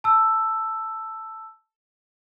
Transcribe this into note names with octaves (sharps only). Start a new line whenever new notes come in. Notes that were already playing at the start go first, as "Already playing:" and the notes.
A5 E6